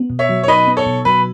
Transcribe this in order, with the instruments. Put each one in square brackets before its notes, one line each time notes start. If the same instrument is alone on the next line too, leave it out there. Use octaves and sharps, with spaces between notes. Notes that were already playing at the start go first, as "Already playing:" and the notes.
Already playing: [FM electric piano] B3
B2
[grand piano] C#5 E5
[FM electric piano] F#3
[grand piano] C#5
[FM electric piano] D#4 [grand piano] B4 D#5
[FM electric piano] B3
[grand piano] A4 C#5
[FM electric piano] B2
[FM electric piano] F#3 [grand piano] B4